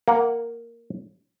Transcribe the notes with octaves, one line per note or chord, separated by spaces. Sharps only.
A#3 F#5